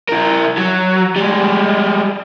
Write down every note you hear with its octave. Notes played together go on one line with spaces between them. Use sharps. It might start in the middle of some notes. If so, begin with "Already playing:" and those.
E4 A#4
F#3
G3 G#3